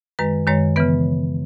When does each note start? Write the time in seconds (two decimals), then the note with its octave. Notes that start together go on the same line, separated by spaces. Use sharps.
0.19 F#2 D#3 G#3 B4
0.47 F#2 D#3 G#3 C#5
0.76 C#3 E3 B3 B4